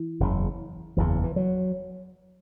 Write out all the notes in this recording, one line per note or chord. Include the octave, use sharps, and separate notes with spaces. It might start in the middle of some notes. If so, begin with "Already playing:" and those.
Already playing: E3
F#1 E2 C#3
F#1 E2 C#3 E3
E3
F#3